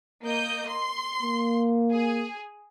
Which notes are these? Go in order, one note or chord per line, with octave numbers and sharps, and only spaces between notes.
A#3 D#5 G6
C6
A#3
G#4